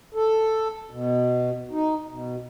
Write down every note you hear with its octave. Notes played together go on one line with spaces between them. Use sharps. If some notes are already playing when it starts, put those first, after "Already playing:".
A4
B2
D#4
B2